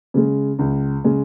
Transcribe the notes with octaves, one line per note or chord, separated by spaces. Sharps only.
C#3 G#3
C#2
C#3 G#3